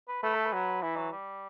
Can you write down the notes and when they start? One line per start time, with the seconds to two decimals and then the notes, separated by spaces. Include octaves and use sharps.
0.08 B4
0.23 A3 B4
0.35 A4
0.46 B4
0.53 F#3
0.82 E3 E4
0.97 F#3
1.12 G3